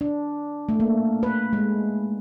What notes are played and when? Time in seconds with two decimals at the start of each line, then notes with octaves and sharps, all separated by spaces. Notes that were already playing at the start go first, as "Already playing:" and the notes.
0.01 D4
0.69 A3
0.80 A#3
1.23 B4
1.53 G#3